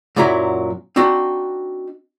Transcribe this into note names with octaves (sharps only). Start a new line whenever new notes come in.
F#2 A#2 F#3 E4 A#5
C4 D4 D#4 F#4